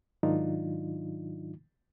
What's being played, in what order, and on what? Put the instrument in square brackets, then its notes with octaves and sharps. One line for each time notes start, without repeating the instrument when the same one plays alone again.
[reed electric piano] G#2 D#3 F#3 D4 D#4 F4